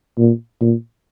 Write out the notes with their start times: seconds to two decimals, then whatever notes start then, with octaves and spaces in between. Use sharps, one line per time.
0.18 A#2
0.61 A#2